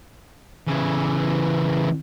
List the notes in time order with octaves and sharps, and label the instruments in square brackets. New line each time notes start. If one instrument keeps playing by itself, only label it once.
[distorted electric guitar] C#3 E3